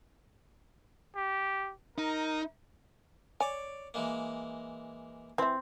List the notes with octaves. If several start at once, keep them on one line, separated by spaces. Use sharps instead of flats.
G4
D#4 A#4
C#5 D5 G#5 D6
E3 G#3 A#3
E3 C4 E5